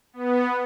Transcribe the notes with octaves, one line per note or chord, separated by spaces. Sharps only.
B3